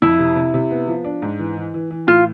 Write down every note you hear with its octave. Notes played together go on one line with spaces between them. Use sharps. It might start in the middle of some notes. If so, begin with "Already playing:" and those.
F2 E4
C3
C3
C3
B3
F3
D4
G#2
E3
E3
E3
E3
A2 F4